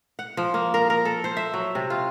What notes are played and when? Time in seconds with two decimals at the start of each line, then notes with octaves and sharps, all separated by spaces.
0.19 F#5
0.37 F3
0.54 A#3
0.74 A#4
0.90 A#4
1.05 A4
1.24 C5
1.37 E5
1.54 F#3
1.75 C3
1.90 F4